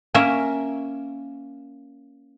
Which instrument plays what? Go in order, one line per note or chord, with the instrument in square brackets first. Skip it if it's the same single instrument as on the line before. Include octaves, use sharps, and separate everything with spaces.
[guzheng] A#3 C#4 A#4 E5